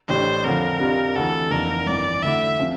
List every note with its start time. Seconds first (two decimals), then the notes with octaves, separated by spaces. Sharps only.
0.09 A1 A2 G3 D4 C5
0.44 F2 D3 F3 A#4
0.80 F2 C3 G3 D4 F4
1.16 D2 C3 E3 A4
1.51 F1 F2 E3 A#3 D4 A#4
1.86 G1 F2 E3 D5
2.23 D2 D3 A3 E4 E5
2.59 C3 F3 C4